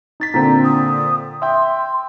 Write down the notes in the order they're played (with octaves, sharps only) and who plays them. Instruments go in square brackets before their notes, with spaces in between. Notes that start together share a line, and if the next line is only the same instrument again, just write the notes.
[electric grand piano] D#4 A6 B6
[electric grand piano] A#2 D3 C4 [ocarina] A#5
[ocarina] D#6
[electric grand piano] E5 G5 [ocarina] C6